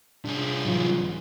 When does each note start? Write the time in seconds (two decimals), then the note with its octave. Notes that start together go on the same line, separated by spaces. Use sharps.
0.25 C2 D4 G#4
0.65 G#2 E3 F#3 F4